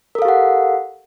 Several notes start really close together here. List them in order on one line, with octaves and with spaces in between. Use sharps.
A#4 A4 F5 G4 F#5